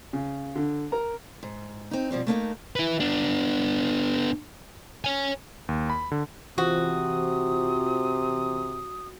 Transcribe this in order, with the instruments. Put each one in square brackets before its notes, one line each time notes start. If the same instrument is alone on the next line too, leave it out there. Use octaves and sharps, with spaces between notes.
[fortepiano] C#3
D3
A#4 A#5
[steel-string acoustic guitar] G#2
C4 D#4
B2 F3 G3 C4
A3 A#3 D4 D#4
[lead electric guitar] E4 B4
B3 D4
C#5 G#5
[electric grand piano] D#2
B5
D3
[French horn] C3 [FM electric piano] E3 F4 C5 [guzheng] F#4 [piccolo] D#6